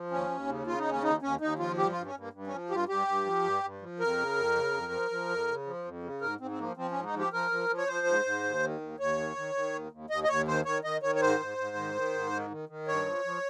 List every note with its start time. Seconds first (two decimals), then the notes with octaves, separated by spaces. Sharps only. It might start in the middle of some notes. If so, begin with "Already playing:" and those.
Already playing: F3
0.11 D#2 C#4
0.30 D#2
0.49 C#3
0.67 C#3 F4
0.78 D#4
0.86 D#2
0.91 C#4
1.03 D#2 D#4
1.22 D#2 C#4
1.41 D#2 D#4
1.59 F3 F4
1.78 G2 G4
1.92 G2 F4
2.06 C#4
2.15 G2 A#3
2.33 G2
2.47 C#4
2.52 F3
2.71 G2 F4 G4
2.89 G2 G4
3.07 G2
3.26 F3
3.44 G2
3.63 G2
3.81 F3
4.00 F2 A#4
4.18 C#3
4.37 F2
4.55 C#3
4.73 F2
4.92 F3
5.11 F3
5.29 F2
5.48 C#3
5.66 F3
5.85 F2
6.03 C#3
6.21 G#2 A#4
6.40 G#2 C4
6.51 C4
6.59 F3 A#3
6.77 F3 C4
6.91 C#4
6.96 G#2
7.05 D#4
7.14 F3
7.19 G4
7.33 F3 A#4
7.51 F3
7.69 F3
7.78 C#5
7.88 F3 C5
8.07 G#2
8.25 G#2
8.43 D#2
8.62 D#3
8.81 D#2
8.99 D#2 C#5
9.17 D#3
9.36 D#3
9.55 D#3
9.73 D#2
9.91 D#2
10.10 D#2 D#5
10.24 D#5
10.29 D#2 C#5
10.48 D#3 C5
10.65 D#3 C#5
10.84 D#3 D#5
11.02 D#3 C#5
11.15 C#5
11.21 G#2 C5
11.40 G#2
11.58 G#2
11.76 D#3
11.94 D#3
12.14 G#2
12.32 D#3
12.50 D#3
12.69 D#3
12.88 G2 C#5
13.06 F3
13.25 F3